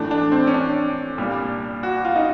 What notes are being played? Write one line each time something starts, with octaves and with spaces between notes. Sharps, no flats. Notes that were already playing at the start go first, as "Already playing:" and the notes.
Already playing: A2 E3 A3 D4
D4
C4
C#4
D4
C2 A#2 G3
F#4
F4
D#4